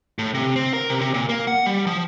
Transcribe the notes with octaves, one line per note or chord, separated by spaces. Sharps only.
A2
C3
C4
A#4
C3
C3
A#2
A#3
F#5
G3
F3